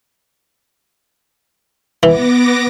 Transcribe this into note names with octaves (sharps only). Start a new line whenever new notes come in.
E3 B3 D6 A#6